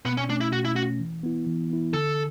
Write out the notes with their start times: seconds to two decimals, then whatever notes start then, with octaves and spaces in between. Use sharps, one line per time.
0.06 B2 B3
0.17 C#4
0.29 A3 D4
0.32 C#4
0.41 E4
0.53 B2 F#4
0.65 E4
0.76 A3 C#4 F#4
1.00 E3
1.23 B3 E4
1.47 E3
1.70 B3 E4
1.94 D3 A4